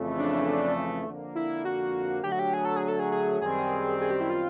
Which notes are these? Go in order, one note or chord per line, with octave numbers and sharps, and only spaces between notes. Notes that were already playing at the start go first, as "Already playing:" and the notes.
Already playing: F2 C#3 E3 A3
D4
F2 D3 F3 A#3
E4
F#4
D3 F#3 A3 G4
F#4
G4
G#4
A4
G#4
A4
G#4
G#4
F#2 D#3 G3 C4 G#4
G#4
G4
E4
F4